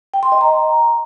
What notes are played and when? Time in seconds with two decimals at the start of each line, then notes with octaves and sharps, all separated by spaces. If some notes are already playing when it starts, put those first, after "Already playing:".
0.14 G5
0.23 C6
0.32 D#5
0.41 A#5